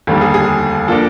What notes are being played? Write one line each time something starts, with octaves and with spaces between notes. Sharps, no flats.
F1 D#2 D3 G3
G#4
G#4
F3 A#3 D4 A4